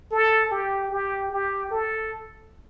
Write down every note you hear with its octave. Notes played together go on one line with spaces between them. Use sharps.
A4
G4
G4
G4
A4